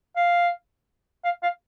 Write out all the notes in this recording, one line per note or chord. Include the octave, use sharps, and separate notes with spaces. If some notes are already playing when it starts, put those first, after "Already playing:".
F5
F5
F5